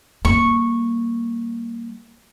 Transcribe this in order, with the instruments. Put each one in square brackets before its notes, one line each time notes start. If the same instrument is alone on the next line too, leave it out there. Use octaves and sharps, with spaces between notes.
[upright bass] G3 A#3 [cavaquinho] C#6